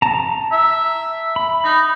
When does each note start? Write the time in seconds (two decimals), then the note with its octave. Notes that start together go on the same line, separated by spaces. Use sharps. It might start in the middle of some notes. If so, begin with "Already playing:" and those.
0.02 A5 A#5
0.52 E5
1.36 B5
1.64 D#4